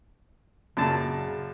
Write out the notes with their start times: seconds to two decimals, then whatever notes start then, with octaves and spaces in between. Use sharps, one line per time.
0.77 F#2 A#2 C#3 A5